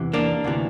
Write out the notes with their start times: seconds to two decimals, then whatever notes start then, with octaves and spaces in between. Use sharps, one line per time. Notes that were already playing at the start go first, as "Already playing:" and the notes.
Already playing: E2 C3 E3
0.13 A#3 D4
0.44 D2 C3 E3